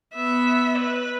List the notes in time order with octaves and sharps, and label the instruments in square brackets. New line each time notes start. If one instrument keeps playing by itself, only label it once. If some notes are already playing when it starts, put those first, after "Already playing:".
[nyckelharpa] B3 [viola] E5
[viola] B4